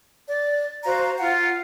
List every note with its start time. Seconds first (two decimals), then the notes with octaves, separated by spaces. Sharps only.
0.28 D5
0.84 F#4 C5 F5 A#5
1.18 F4 F5 F#5